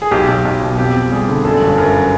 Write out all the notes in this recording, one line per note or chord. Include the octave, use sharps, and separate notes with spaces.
G#4
B1 G4
B1
B1
B2
F2 G4
F2
G3 G#4
D3
F#2 A4
G1
F#2 A#4